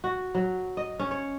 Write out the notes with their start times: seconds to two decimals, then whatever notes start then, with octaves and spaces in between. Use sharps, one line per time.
0.04 F#4
0.35 F#3
0.77 D#5
0.99 C#4
1.11 C#5